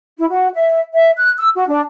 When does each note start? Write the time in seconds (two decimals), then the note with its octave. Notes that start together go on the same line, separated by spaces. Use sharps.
0.18 E4
0.30 F#4
0.55 E5
0.94 E5
1.16 F#6
1.38 E6
1.55 F#4
1.68 D4